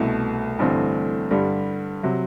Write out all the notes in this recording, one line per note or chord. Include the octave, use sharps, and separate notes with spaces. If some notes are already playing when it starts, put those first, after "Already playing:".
Already playing: C2 B2 A3
A1 G2 D3 A3 C4
G2 D3 G3
C3 F#3